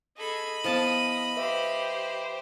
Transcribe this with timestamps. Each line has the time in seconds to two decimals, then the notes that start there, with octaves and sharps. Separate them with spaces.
0.17 G#4 A4 D#5 B5
0.64 F3 B3 E4 A5 D#6
1.37 G4 B4 C5 E5